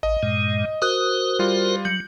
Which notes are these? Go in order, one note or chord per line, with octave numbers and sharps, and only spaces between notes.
A1 D#5
G2 A#2 G#3
F#4 A#4 C5 D#6 F#6
G3 F4
F#3 G6